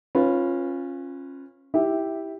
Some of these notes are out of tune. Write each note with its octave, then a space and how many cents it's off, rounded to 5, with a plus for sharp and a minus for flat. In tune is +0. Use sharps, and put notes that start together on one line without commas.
C#4 -25 F4 +0 B4 +0
E4 -10 G4 +0 E5 +0